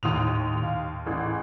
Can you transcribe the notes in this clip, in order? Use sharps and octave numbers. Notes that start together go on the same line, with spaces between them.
D#2 A2 D#6 F7
F5
A1 G#4